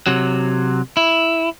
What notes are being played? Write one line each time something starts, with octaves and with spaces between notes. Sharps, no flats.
C3 F#3
E4